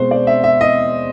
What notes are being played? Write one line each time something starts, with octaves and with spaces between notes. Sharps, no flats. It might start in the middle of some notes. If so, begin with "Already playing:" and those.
Already playing: B2 G#3 C4 C5
D5
E5
E5
D#5